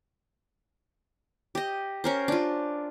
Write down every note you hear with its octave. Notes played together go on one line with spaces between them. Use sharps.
G4 D#5
C#4 A#4 C5
D4 F4